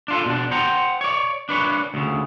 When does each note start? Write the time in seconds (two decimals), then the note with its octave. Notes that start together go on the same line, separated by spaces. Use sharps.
0.08 D4 F4 A4
0.26 B2 D4
0.51 C5 F#5 G5 A#5
1.01 C#5 D5
1.49 D4 B4 C#5
1.94 D2 C#3